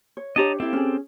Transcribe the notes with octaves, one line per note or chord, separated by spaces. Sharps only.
C#5
D4 G4 C#5 D#5 A5 A#5
C4 E4 G4 A4 F5
C#4 G#4